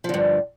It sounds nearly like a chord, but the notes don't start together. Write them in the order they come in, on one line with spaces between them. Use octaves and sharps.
F3 D3 G2